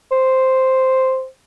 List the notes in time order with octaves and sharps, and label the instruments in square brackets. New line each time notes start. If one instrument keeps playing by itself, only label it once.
[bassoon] C5